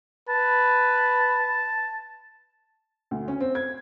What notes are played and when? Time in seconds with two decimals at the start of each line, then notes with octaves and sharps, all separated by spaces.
0.29 B4 A5
3.11 D2
3.28 C#4
3.41 C4
3.55 G#6